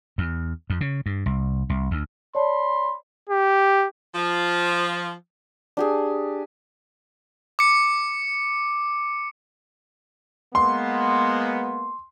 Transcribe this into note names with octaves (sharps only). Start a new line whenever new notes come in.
E2
F2
C#3
G2
C2
C2
D2
C#5 D5 A5 B5 C6
G4
F3
D4 G4 G#4
D6 C#7
G#3 A#3 B3 C6